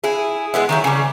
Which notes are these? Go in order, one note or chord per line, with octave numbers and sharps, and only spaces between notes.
E4 G#4
G#3 B3 E4
D#3 F#3 E4
C#3 G3